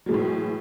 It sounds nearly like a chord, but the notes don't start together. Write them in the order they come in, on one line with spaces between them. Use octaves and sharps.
F#3 G#3 E3 A2